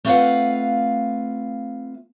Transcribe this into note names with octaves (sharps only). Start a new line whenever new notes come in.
A3 C4 F4 B4 F5 F#5